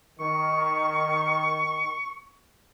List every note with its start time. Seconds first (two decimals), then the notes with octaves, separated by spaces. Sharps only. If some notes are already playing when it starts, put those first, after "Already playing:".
0.20 D#3 C#6